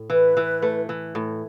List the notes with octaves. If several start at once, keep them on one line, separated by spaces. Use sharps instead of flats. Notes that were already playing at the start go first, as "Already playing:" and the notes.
Already playing: A2
E3 B4
E3
A3
E3
A2